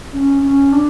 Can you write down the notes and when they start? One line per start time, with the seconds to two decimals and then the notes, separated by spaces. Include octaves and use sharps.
0.13 C#4
0.43 C#4
0.73 D4